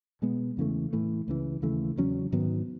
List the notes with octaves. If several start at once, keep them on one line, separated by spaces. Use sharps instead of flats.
B2 G#3 B3
E2 C#3 E3 A3
A2 E3 A3
C#2 C#3 E3
D#2 C#3 E3 A3
E2 C#3 F#3 C#4
G#2 D#3 F#3 B3